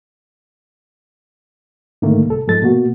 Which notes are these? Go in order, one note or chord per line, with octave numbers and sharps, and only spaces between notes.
G#2 D3 D#3 A3 A#3
C2 A4
G#2 F3 G#3 A4 A6
B2 A#3 F#4